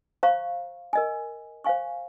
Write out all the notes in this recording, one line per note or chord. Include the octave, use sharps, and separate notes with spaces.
C5 F5 A#5 C#6
A#4 D#5 G#5
C5 F5 G#5 C#6